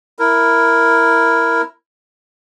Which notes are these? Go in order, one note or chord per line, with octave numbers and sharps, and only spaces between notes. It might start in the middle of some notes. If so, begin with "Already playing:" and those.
E4 A#4